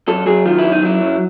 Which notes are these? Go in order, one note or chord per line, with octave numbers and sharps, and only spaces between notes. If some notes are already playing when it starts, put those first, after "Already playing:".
F#2 A4
F#3 G#4
D#3 F4
E4
F#2
D#4
F#3 E4
F#2